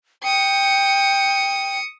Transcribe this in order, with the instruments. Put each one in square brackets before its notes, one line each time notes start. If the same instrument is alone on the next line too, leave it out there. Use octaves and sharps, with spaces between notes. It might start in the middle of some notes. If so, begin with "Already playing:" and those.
[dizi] G5 [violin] D#6 C#7